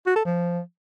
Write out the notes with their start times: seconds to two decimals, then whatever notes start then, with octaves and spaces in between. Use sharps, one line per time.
0.06 F#4
0.16 A4
0.25 F3